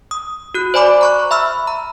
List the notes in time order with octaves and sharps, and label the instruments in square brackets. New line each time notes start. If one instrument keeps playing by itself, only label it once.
[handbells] D#6
F#4 F#6
C5 D5 G#5 B5 D6
A#5 C#6 F#6
E5 B5 E6 F6
A#5